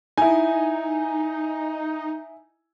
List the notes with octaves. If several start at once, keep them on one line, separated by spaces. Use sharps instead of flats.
D#4 E4 G#5